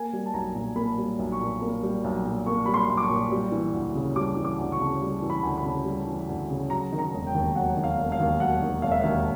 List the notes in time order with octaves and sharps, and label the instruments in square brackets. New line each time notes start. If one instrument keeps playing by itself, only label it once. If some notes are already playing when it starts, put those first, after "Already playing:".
Already playing: [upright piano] A#3 G#5
G3
A5
B1 A#5
A#2
A#3 B5
G3
B1
C#6
A#2
A#3
G3
B1
A#2
A#3 C#6
G3 B5
C6
B1
D6
C#6
A#2
G3
E3
D2
C#3
G3 D6
E3
D6
D2
C#6
C#3
G3
E3
B5
D2
B5
C#3
G3
E3
D2
C#3
F#3 A#5
D#3
A#5
E1
G5
D#2
F#3 F#5
D#3
F5
E1
F5
D#2
F#3 F#5
D#3
E1 F5
E5
D#2 F5